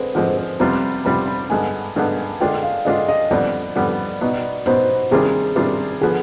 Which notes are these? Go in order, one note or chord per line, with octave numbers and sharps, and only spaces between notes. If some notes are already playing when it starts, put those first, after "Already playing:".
Already playing: D3 G#3 C4 B4 C5
D3 F3 G#3 C4 C5
C5
C5
F2 C3 G3 B3 F4
F2 C3 G3 B3 F4 B5
B5
G2 D3 G#3 B3 G#5
G2 D3 G#3 B3
D3 G#3 D4 F4 G5
F5
D3 G#3 D4 F4 D#5
D#5
F2 D3 G3 B3 D5
F2 D3 G3 B3
B2 B3 D#4
B2 B3 D#4 C5
C3 D#3 G3 D4 F4 G#4
C3 D#3 G3 D4 F4
D3 F3 B3 G#4